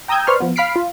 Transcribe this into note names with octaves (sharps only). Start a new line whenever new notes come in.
G5 A#5 D#6 E6 G6 G#6
B4 C5 D5 C6 C#6 F6
F3 B3
F5 B5 F6 B6 C7 D7
F4